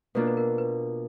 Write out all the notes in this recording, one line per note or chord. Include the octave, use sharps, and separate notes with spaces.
B2 A#3 D4 F4 A#4
B4
A#4
B4